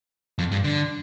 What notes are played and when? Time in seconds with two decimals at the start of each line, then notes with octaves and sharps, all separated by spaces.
0.39 F2
0.52 G2
0.64 D3